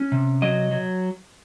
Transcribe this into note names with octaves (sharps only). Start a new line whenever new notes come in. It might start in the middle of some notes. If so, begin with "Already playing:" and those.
Already playing: C#4
C3
F#3 D#5
F#3